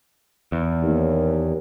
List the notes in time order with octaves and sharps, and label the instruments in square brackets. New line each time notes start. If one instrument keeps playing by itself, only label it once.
[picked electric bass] E2
[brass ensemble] D#2